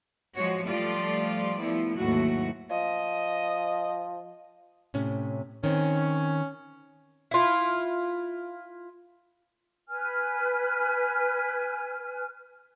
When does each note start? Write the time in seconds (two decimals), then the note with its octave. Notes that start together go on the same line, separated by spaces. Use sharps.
0.35 F3 G#3 F#4 C#5
0.67 F3 G3 A3 F4 G4 D5
1.60 F3 A3 B3 E4
1.97 D#2 G#2 E3 F#3 A3 F#4
2.71 F3 D#5
4.94 A2 C3 C#4
5.64 D#3 C4 C#4
7.31 E4 F4
9.87 B4 G#5 F6